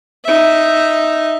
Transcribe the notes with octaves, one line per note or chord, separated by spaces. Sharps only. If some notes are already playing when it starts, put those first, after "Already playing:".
D#4 E5